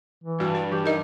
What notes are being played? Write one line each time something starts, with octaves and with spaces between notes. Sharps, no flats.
E3
G2 F#4
B4
E3 G4
D#4 A#4 D#5